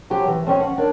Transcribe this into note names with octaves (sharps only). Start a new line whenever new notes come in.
F3 F#3 C#4 G4
E3
F3 C4 C#4
F#5
D4 A#4 C#5